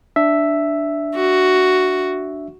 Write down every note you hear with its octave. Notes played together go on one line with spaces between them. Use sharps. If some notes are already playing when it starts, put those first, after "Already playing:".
D4 E5
F#4